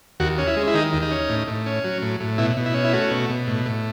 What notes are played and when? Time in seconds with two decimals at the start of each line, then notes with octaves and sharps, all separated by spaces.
0.20 D#2 F#4
0.38 C#4
0.47 E4
0.56 G#3
0.67 E4
0.74 D#3 D#4
0.93 D#2
1.02 D#4
1.11 C#4
1.29 A2
1.48 A2
1.66 C#4
1.84 F#3
2.02 A2
2.20 A2
2.38 B2 E4
2.57 B2
2.66 E4
2.74 C#4
2.85 E4
2.93 A3 F#4
3.11 B2
3.29 B2
3.47 A2
3.66 A2